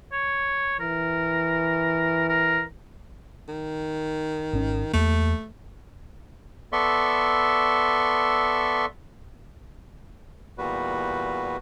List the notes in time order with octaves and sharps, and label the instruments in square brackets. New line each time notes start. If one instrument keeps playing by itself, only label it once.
[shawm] C#5
[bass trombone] E3 [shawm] A#4
[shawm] A#4
[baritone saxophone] D#3
[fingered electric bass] G#1 C#4
[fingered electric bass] E2 A#3 [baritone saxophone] A3
[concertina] B3 A4 D5 E5 C6 C#6
[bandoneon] E2 A#2 G3 F#4 B4